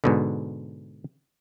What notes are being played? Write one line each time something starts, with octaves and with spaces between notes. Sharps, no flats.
G#2 B2 D3